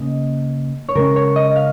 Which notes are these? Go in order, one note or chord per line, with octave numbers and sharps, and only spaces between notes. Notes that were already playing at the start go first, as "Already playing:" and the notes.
Already playing: C#3 A#3 C#4 D#5
C#5
C#3 G#3 C#4 A#4
C#5
D#5
F5